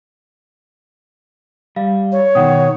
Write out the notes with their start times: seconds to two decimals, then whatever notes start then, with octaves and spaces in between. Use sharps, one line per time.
1.76 G3 F5
2.12 C#5
2.35 B2 D#3 F#5 G5 D#6